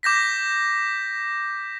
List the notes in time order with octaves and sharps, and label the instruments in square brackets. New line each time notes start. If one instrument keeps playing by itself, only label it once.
[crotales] D6 G6 A#6 B6